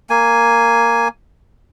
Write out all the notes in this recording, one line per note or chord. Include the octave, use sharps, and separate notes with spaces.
A#3 G#5